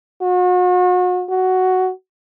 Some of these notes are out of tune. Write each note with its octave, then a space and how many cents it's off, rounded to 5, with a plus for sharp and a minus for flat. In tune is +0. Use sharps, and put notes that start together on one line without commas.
F#4 -40
F#4 +5